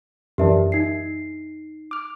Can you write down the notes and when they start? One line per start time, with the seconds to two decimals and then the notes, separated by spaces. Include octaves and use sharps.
0.38 F#2 E3 D4 G4 A#4 E5
0.72 D#4 C7
1.91 D6 F6